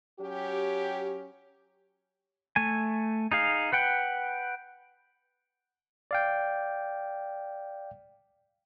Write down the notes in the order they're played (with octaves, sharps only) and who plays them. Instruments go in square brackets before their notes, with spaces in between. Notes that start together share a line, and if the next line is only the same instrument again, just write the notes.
[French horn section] F#3 C#4 G4
[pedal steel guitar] A3 G#5
D#4 G#4 F5
B4 F#5 G5
[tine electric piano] D5 F5 G5